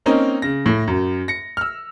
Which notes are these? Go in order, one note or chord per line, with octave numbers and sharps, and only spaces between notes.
A#3 C4 C#4 D#4
C#3 A#6
A2
F#2
A#6 C#7
E6 F6